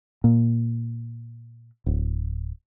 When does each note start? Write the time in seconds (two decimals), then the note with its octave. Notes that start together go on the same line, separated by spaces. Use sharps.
0.24 A#2
1.86 D1